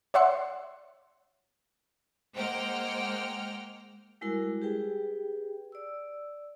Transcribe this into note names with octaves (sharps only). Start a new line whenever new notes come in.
C#5 D5 E5 F#5 C6 C#7
G#3 A#3 C5 F#5 G5 F6
G3 G#3 E4 F#4 A#4
G4 G#4 B4 G5
D5 E6